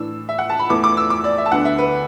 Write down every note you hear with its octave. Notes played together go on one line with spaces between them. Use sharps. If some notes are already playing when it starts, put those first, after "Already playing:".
Already playing: A2 E3 D4 E6
E5
F#5
A5
B5
E2 E3 A3 E4 D6
D6
E6
D6
D5
E5
A5
D2 D3 B3 D4 F#5
E5
B4